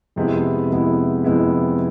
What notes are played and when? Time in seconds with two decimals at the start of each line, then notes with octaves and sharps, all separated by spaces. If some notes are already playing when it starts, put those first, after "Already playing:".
0.16 F2 C3 G#3 B3 E4
0.70 F2 C3 G#3 B3 E4
1.24 F2 C3 G#3 B3 E4